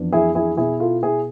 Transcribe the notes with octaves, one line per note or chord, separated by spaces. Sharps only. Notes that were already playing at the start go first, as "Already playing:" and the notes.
Already playing: F2 E3 B3 D4
E4 G#4
E4 G#4
B2 B3 E4 G#4
F4 A4
E4 G#4